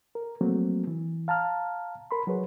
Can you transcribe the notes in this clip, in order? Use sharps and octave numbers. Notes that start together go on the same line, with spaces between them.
A#4
F3 F#3 A3 A#3 C4
E3
F5 A5 A#5 F6
A#4 B5 C6
F#3 F#4 G#4 B4 C#5